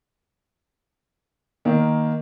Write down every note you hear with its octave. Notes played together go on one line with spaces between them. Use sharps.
D#3 A#3